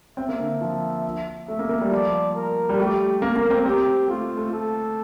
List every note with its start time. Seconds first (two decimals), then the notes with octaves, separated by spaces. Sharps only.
0.17 C4 E5
0.29 A#3
0.40 D3
0.61 F3
1.48 A3 E5
1.59 A#3
1.69 A#3
1.81 G3
1.91 F3 D5
2.35 A#4
2.69 G3
2.78 A3 G4
3.22 A#3 A#4
3.36 A#3
3.50 C4
3.65 C4 G4
4.08 A3 F4
4.38 A3
4.51 A4